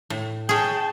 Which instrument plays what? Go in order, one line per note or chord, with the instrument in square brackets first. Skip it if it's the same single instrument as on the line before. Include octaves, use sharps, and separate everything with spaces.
[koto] A2
[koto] C#4 G#4 [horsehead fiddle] G5 A5